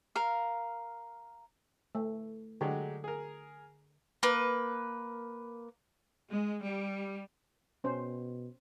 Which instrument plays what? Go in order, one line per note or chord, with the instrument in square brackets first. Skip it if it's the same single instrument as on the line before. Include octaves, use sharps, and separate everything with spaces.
[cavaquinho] A#4 F5
[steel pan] A3
[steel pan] D3 [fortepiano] F#3 G#3 G4
[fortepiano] G#4 A#4
[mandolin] A#3 B4
[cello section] G#3
G3
[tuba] B2 [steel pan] C#4 C5